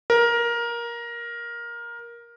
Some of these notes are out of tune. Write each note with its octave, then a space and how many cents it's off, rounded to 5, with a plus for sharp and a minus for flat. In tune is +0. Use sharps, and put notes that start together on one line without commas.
A#4 +15